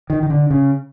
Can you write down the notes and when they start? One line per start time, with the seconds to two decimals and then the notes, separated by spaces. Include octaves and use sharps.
0.10 D#3
0.23 D#3
0.30 D3
0.51 C#3